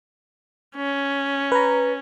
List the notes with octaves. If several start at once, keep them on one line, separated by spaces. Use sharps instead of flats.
C#4
B4 A#5